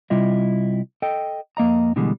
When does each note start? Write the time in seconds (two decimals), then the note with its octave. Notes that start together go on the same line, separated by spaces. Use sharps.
0.10 C3 G3 E4 F4 D#5
1.02 A4 D#5 G5
1.57 F2 A#3 D#5 A#5
1.96 B2 D3 E3 G3 G#3 D4